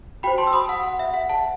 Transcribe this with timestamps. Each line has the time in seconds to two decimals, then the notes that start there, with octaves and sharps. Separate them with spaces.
0.23 F#4 C5 G5 B5
0.38 A5 C6
0.47 E6
0.53 B5 D#6
0.69 F#5
0.84 F#5
0.99 E5
1.14 F#5
1.29 F#5 A5